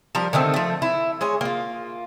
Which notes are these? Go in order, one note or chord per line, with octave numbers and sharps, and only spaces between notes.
F3 G3 A#4
D3 D#3 A3 C4
F3 A3
E4
G#3 G#4 C#5
A#3 F4